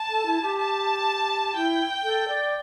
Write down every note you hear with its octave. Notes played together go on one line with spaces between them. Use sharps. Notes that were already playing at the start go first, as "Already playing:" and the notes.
Already playing: A5
A4
E4
G4
A5
E4 G5
A4
D5